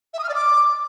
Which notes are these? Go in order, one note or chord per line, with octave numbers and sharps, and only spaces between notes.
E5
D#6
F6
D5
D6